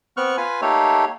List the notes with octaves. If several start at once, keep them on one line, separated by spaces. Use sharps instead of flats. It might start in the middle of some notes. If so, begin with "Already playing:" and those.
B3 C4 C#6 F6 F#6
F4 B4 G#5
A3 A#3 D#4 G4 A4 C#5